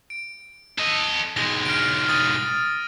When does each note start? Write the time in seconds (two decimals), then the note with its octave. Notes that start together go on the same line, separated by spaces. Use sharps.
0.10 D7
0.78 A4 D#5
1.36 B1 G#3 A#6
1.65 F6 D7
2.09 D#6 A6 D#7